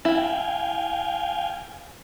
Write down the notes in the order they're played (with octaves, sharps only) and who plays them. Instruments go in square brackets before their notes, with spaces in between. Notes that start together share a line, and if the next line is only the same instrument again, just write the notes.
[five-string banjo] E4 [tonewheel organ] F5 G5 G#5